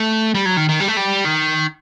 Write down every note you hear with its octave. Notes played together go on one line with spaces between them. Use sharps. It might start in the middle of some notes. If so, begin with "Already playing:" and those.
Already playing: A3
G3
F#3
D#3
D#3
G3
A3
G3
D#3